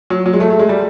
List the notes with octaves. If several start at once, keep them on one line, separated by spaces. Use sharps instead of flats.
F#3
F#3
G#3
A3
A3
G#3
G3